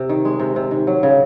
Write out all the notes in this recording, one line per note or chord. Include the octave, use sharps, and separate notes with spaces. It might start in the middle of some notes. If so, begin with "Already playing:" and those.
Already playing: C3
D#3
G#3
C3
C3
D#3
F#3
C#3